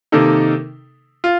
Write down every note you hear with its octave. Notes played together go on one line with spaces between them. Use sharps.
C3 D#3 A#3 D#4 A4
F4